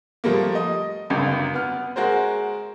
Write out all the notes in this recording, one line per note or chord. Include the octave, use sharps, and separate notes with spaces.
F3 G3 A3 A#3
D#5
G1 C#2 F#2
B3 F6
G#3 F#4 A#4 C5